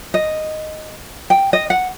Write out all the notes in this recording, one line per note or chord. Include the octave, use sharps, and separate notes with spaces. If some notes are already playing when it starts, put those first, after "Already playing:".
D#5
G5
D#5
F#5